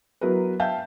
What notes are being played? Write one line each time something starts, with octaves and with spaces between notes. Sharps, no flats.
F#3 B3 E4 A#4 B4
E5 F5 G5 A5 G6